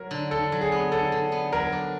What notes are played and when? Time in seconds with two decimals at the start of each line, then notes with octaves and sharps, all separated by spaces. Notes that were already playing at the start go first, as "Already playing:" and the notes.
Already playing: F#3 A#4
0.11 D3
0.31 D3 A4
0.52 F#3
0.61 G#4
0.72 B3
0.92 D3 A4
1.12 D3
1.32 B3
1.52 F#3 A#4
1.72 D4